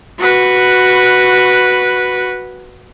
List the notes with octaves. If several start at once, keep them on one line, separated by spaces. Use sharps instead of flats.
F#4 B4